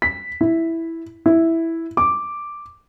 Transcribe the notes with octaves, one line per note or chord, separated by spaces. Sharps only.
B6
E4
E4
D6